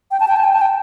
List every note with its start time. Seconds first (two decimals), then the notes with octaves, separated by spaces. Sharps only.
0.11 G5
0.20 A5
0.28 G5
0.36 A5
0.44 G5
0.53 A5
0.61 G5